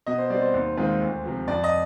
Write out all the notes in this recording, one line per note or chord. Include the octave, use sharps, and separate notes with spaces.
B2 D#5
C5
G3 C4 D5
C5
D#2
D#3 G#3 C4 F4
D2
C3 F3
F2 D5
D#5